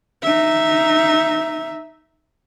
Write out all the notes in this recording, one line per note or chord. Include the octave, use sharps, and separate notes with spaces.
D#4 E5